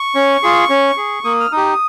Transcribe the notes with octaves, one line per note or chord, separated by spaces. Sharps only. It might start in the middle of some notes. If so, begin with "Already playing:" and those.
Already playing: C#6
C#4
F4 G#4
C#4
G#4
A#3 D#6
F6
D#4 G4 D#6